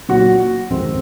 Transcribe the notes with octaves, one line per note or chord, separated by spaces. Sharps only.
A#2 F#3 F#4
F2 C3 D#3 G#3 C4